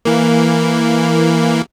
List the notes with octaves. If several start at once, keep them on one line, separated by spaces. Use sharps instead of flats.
E3 A#3